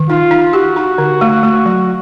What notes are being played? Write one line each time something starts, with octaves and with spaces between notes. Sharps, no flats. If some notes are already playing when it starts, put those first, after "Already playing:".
Already playing: D#3
D#4 F4
D#4
F#4 G4
D#4
D3
A3
A3
F#3